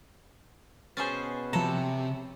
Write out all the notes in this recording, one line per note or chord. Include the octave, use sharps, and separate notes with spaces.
B2 C#4 G#4 B4 C5 G#5 A6
C3 F3 A4 A#5